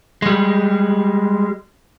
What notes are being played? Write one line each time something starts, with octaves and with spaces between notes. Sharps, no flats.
G3 G#3